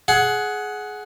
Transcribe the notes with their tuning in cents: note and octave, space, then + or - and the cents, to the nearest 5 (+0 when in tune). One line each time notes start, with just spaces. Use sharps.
G#4 +20 F#5 +0